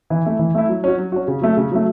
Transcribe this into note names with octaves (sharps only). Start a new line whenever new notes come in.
E3
A3 E4
E3
A3 E4
F#3
C#4 F#4
F#3
C#4 F#4
C#3
F#3 A3
C#3
F#3 A3